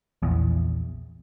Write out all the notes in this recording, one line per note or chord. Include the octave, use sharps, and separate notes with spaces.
A#1 E2